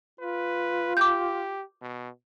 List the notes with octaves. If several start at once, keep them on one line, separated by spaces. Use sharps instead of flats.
F4 B4
G4 D6 G6
B2